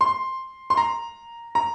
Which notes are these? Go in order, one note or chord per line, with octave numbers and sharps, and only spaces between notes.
C6
C6
A#5
A#5